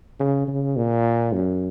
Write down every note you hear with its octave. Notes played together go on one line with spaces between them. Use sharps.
C#3
C#3
A#2
F#2